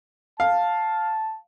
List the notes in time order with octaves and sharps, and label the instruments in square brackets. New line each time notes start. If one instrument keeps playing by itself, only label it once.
[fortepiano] F5 [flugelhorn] A5